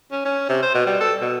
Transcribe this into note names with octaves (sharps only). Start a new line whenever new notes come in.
C#4
C#4
C3
C5
B2
G3
A4
B2